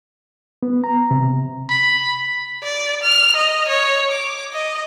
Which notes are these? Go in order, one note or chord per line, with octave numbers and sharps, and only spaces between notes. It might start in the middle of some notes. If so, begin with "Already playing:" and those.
B3
A#5
C3
B5
D5
F6
D#5
C#5
D6
D#5